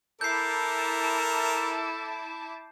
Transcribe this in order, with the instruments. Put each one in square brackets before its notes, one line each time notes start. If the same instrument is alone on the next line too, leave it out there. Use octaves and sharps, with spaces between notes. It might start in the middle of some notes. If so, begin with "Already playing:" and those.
[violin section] E4 A5 D6 [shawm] A4 [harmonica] A#4 [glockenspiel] G6 C7